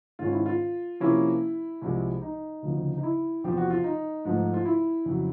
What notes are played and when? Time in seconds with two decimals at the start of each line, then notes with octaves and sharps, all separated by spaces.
0.19 G#2 D#3 G#3 C#4 F4
0.32 E4
0.46 F4
1.00 C3 F3 A#3 C#4 E4
1.81 C2 C3 F3 G#3
2.22 D#4
2.62 D2 C#3 F3
2.97 D#4
3.03 E4
3.44 E2 C3 F3 G4
3.57 F#4
3.70 F4
3.84 D#4
4.25 G#2 F3 A3
4.54 F4
4.65 E4
5.06 F2 C#3 F#3